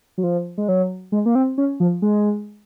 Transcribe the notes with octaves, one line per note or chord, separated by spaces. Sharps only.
F#3
F3
G#3
F#3
G#3
A#3
C4
C#4
F3
G#3